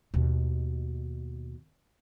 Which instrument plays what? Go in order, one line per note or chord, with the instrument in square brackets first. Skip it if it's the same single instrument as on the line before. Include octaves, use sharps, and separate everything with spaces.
[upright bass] D#2 B2